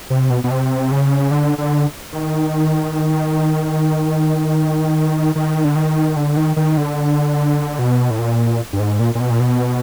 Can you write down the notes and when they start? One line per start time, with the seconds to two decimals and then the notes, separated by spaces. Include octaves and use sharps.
0.10 C3
0.30 B2
0.44 B2
0.51 C3
0.92 C#3
1.31 D3
1.58 D3
2.13 D#3
5.35 D#3
5.64 D3
5.76 D#3
6.16 D3
6.37 D#3
6.56 D#3
6.77 D3
7.79 B2
8.10 A2
8.19 A#2
8.73 G2
8.79 G#2
8.99 A#2
9.15 A#2
9.20 B2
9.30 A#2
9.40 B2